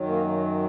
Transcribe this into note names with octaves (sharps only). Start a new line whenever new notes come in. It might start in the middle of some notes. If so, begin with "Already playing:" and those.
Already playing: F#2 D#3 F#3
A#3